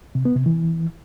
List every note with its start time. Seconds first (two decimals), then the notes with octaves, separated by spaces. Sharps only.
0.15 C3
0.25 B3
0.36 C3
0.46 E3